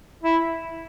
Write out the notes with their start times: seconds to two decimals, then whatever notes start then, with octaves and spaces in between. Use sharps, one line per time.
0.23 E4